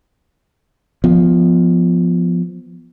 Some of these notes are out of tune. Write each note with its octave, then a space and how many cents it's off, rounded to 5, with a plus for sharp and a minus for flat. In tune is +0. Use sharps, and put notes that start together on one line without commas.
F3 +0 B3 +0